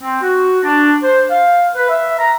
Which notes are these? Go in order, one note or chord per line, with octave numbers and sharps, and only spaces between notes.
C4
F#4
D4
C5
F5
B4
E5
A#5